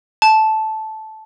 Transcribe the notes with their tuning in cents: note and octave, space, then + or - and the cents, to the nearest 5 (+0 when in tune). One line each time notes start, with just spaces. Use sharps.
A5 -10